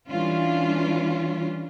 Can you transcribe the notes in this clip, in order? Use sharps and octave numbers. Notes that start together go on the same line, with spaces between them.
E3 G3 C#4 D4 F4